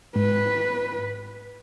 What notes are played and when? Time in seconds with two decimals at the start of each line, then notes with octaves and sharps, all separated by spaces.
0.16 G#2 B4